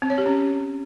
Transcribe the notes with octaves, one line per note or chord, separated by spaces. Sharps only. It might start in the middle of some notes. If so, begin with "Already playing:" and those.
C4
C#5
G4
C#4